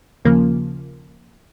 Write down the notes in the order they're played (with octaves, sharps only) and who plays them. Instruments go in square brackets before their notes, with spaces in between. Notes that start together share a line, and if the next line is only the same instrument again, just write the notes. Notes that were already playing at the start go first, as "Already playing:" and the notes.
[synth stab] D#2 C#3 F3 A#3